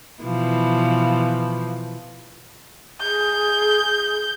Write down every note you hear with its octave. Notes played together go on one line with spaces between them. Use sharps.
B2 E3 F3
G#4 G6